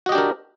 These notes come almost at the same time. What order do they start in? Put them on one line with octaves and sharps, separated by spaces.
F#4 D#5 G4 D4 A#4